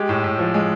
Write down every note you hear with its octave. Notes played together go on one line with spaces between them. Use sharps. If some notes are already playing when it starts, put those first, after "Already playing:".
Already playing: G#3 G4
A2
A2
F3
G#3